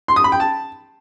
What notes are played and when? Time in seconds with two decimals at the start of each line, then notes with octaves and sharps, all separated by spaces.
0.08 C6
0.16 D#6
0.24 B5
0.32 G5
0.40 A5